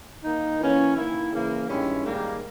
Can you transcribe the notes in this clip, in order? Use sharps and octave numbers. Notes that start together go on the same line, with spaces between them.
D#3 A#3 D#4
E3 A#3 C#4
D#3 A#3 E4
C#3 E3 A#3
G2 D#3 G#3 C#4 E4
G#2 D#3 G3 A#3